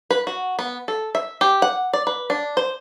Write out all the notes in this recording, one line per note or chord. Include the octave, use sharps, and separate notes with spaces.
B4
F#4
B3
A4
E5
G4
F#5
D5
B4
D4
C5